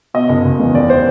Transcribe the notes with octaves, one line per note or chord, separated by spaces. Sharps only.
B2 D#5
F#1
F#1
E2
D#2 D5
C5